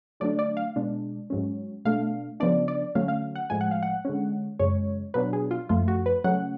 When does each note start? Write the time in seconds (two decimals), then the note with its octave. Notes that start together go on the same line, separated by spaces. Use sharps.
0.20 D3 F#3 A3 D4 D5
0.39 D5
0.57 F5
0.76 B2 G#3 D4
1.30 G#2 F#3 C#4
1.85 B2 A3 D4 F5
2.40 C#3 F3 B3 D4 D5
2.68 D5
2.95 D3 F#3 A3 C#4 F5
3.08 F5
3.35 F#5
3.50 A2 F3 G#3 G#5
3.61 F#5
3.71 F5
3.83 F#5
4.05 D3 G#3 C#4
4.59 F#2 C#3 G#3 C#5
5.14 B2 F#3 B3 D4 B4
5.33 G#4
5.51 F4
5.69 F#2 F3 A3 F4
5.88 F#4
6.06 B4
6.24 C#3 F#3 A3 C#4 F#5